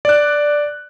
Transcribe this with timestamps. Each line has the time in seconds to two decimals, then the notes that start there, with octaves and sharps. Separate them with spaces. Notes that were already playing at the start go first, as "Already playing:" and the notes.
0.05 D5 F#6